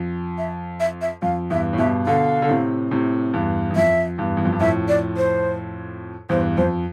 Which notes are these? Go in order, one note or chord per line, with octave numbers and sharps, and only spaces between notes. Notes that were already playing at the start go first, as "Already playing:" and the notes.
Already playing: F2
E5
E5
E5
F2 F5
E2 G2 E5
A2
G2 B2 E5
B2 D3 F5
D3
A2 C3
A2 C3
E2 G2
E2
F2 E5
E2 G2
E2
F2
G2
F2 A2 E5
D5
C5
E2 G2 C5
F2 C5